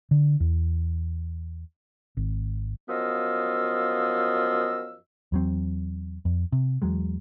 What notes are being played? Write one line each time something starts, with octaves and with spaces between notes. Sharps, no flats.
D3
E2
G#1
F#2 F3 B3 D#5 F5 E6
E2 F#3 C4
F2
C3
E2 F#3 G#3